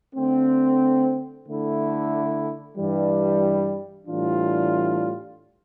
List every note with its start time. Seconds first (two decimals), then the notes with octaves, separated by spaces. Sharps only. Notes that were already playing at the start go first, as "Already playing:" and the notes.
0.15 D3 A3 C4
1.47 D3 A3 E4
2.77 G2 E3 G3
4.07 A2 E3 G3 D4 F4